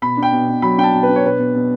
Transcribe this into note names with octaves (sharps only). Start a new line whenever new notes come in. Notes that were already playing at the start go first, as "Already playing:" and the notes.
B2 B5
D4
G5
B2
B2
F#3 B5
D4 G5
A5
B2
B4
D4
C#5
B2 B4
B2
B2